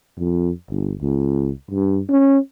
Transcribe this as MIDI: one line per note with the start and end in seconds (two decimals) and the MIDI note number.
0.18 0.51 41
0.70 0.93 31
1.02 1.50 37
1.71 2.01 43
2.10 2.38 61